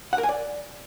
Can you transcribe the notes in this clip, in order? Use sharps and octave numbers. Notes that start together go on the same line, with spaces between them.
F#5
A#4
G#5
D5